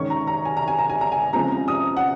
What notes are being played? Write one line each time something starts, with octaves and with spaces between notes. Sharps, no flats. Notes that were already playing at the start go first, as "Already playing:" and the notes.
Already playing: D#3 G#3 C#4 C#6
A#5
A#5
G#5
A#5
G#5
A#5
G#5
A#5
G#5
C#3 F3 G#3 C4 A#5
D#6
F#5